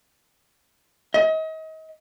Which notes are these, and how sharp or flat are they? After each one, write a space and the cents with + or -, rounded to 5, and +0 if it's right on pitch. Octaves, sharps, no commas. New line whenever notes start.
D#5 +35